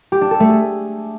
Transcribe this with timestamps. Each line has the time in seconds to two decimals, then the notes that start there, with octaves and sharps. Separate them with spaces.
0.12 G4
0.21 D4
0.31 A4
0.40 A3
0.49 G#4